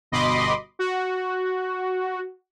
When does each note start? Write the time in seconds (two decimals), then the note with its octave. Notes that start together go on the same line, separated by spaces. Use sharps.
0.12 G1 B2 D#5 B5 C6 D6
0.79 F#4